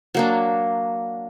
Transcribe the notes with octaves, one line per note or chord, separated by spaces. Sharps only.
F#3 A#3 D4